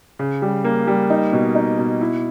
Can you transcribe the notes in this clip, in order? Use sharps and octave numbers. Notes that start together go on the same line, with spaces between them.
C#3
G3
A#3
G3
D#4
B2
D#4
B2
E4